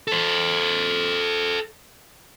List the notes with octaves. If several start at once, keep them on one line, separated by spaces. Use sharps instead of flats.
A4 C5